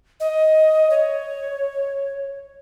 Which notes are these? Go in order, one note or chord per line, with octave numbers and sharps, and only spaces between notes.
D#5
C#5